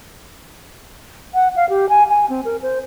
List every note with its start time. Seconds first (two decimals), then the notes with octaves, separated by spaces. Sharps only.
1.34 F#5
1.56 F5
1.69 G4
1.89 G#5
2.09 G#5
2.30 C4
2.45 A#4
2.62 C5